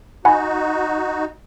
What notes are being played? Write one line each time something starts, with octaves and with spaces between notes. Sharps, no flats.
D#4 F#4 F#5 G#5 B5